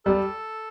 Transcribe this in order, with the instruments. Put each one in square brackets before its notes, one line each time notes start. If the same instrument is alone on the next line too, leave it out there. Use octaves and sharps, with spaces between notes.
[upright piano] G3 [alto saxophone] A4